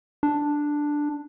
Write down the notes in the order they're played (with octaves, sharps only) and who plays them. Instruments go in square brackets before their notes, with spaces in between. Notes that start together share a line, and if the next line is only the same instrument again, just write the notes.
[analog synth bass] D4